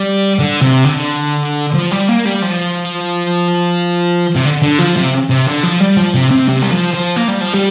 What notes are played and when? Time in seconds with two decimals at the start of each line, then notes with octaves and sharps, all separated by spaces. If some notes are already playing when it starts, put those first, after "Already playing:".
Already playing: G3
0.39 D3
0.61 C3
0.84 D3
1.74 F3
1.92 G3
2.09 A#3
2.25 G3
2.42 F3
4.36 C3
4.45 D3
4.62 D3
4.79 F3
4.96 C3
5.30 C3
5.47 D3
5.63 F3
5.80 G3
5.97 F3
6.14 C3
6.31 C3
6.48 C3
6.63 G3
6.71 F3
6.94 F3
7.16 A#3
7.28 G3
7.41 F3
7.54 G3